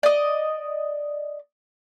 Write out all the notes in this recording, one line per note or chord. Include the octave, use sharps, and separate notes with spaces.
D5 D#5